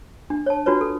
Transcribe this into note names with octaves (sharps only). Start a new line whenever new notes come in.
D4
C#5 A5
D4 F4 F#4 B4 C#5
A4